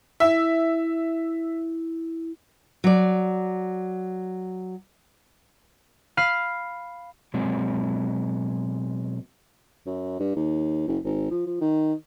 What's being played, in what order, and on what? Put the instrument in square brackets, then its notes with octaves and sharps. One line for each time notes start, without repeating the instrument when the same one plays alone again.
[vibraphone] E4 [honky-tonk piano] E5
[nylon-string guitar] F#3 D5
[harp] F5 B5 F6 D#7
[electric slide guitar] B2 F#3 G#3 C4
[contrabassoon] F#2
G2
D#2
F#1
G#1
F3
F3
D#3